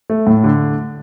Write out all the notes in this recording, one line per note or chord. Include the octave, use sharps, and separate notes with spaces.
A3
A2
D3